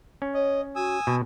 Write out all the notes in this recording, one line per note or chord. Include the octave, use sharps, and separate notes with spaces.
C#4
C#5 D#5
F#4 G#5 D#6 E6
B2 B3